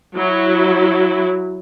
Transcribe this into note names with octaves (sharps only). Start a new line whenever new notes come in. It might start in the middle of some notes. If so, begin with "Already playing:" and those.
F#3 E4